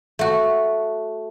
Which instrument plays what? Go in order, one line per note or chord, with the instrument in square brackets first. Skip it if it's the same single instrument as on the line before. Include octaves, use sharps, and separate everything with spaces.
[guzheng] A3 F#4